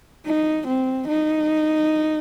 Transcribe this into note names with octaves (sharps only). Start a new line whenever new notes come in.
D#4
C4
D#4